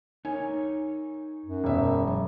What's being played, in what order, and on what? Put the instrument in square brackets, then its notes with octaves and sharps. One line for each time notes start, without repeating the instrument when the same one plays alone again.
[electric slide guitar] D#4 A#4 C#5 [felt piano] G#5
[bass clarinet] F#2
[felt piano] E1 E5
[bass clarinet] F#3